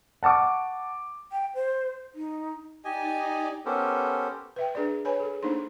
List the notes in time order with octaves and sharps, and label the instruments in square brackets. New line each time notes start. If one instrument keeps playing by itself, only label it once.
[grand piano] F#5 A5 C#6 D6
[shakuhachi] G5
C5
D#4
[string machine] D#4 D5 [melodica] G4 D#5 G#5
[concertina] B3 C#4 G4 A4 A#4 C5
[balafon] B4 E5 G5
D4 G#4 B4 D5
B4 C#5 G#5 B5
G#4 A4
A#3 D4 D#4 C5 C6